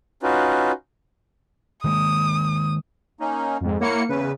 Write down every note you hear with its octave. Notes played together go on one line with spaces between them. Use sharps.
C#4 D#4 F4 F#4 B4
D#3 G#3 A#3 D#6
A#3 C#4 D#4
F2 G#2
A#3 E4 C#5 F#5 C#7
E2 C#3 B4